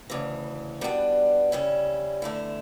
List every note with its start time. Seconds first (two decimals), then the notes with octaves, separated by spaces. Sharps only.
0.10 D2 C#3 E3
0.81 B2 G3 B3 D4
1.52 C#3 G3 C#4 E4
2.22 E2 D3 A3 E4